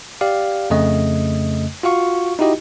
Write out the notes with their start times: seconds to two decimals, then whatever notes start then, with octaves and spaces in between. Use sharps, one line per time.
0.21 G4 D5 F5
0.70 F2 C#3 A3 D#5
1.83 F4 F#4 F5 C#6
2.39 D#4 E4 F#4 G4 D#5